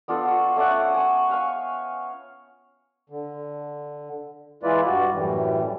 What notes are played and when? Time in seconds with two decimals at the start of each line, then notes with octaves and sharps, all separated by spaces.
0.08 B3 D4 F4 A4
0.25 F5 C#6
0.56 A3 C#4 D5 F#5
0.94 G#5 C#6
1.30 E5 F5 G#5 C#6
3.10 D3
4.63 E3 G#3 E4 F4 B4 D5
4.86 G2 G3 F#4 D5
5.12 F#2 A2 E3 G3